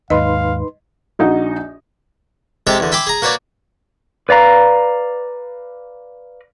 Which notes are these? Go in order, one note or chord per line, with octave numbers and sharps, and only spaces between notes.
D#2 G#2 D#4 B4 D#5 F5 C6
A#1 D#4 F#4 D#5
C3 G#3 G4 A4 G5
E2 D3
E5 G5 G#5 B5 C6 D6
G#4 A#5
A#3 F#4 B4 C#5 D5
B4 D5 F5 A#5